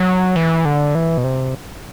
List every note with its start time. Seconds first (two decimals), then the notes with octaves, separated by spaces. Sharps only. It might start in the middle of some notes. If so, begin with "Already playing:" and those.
Already playing: F#3
0.36 E3
0.65 D3
0.95 E3
1.17 B2
1.24 C3